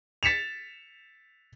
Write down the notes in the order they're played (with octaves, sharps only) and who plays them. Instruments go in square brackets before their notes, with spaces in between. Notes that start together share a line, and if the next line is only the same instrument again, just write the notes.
[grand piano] A6 B6 C#7 E7 F7